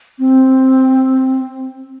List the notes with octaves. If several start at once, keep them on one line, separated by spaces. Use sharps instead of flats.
C4